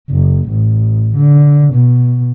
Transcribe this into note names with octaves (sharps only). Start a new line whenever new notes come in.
F#1
A1
D3
B2